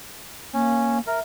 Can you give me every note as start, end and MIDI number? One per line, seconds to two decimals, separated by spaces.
0.54 1.01 58
0.54 0.98 61
1.07 1.20 70
1.07 1.21 76